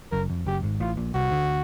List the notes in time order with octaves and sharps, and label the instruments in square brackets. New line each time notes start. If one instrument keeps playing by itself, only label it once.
[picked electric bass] F#1 F#2 [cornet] A#4
[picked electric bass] F2
[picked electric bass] F#1 F#2 [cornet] G4
[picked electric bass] G#1 G#2
[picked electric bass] A1 A2 [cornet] F4
[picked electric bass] A#1 A#2
[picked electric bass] C2 C3 [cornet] F#4
[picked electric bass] D2 D3